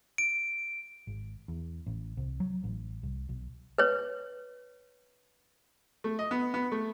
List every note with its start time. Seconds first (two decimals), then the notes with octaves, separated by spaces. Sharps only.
0.18 D7
1.07 G#1
1.48 E2
1.86 A1
2.17 C2
2.40 F#3
2.64 A1
3.03 C2
3.29 B1
3.78 B4 C#5
6.04 A3
6.19 D#5
6.31 B3
6.54 B3
6.72 A3